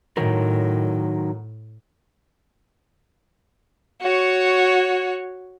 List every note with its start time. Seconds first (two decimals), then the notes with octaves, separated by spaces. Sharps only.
0.17 A2 D#3 F#3 A#4
4.01 F#4 C#5